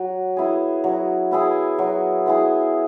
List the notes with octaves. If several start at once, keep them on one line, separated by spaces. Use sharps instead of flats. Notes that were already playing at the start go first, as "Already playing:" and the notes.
Already playing: F#3
B3 E4 G#4
F#3
B3 E4 G#4
F#3
B3 E4 G#4